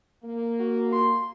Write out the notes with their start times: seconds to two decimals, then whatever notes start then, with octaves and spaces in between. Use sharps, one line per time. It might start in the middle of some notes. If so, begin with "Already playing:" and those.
0.23 A#3
0.59 F#4
0.92 C6